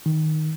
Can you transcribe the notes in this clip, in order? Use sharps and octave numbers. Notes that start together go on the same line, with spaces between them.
D#3